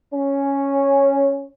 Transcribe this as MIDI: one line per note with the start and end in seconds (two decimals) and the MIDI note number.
0.13 1.46 61